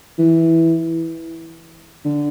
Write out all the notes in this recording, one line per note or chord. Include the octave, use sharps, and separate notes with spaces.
E3
D3